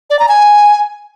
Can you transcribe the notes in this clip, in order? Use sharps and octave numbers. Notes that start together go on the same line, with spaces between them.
D5
A#5
G#5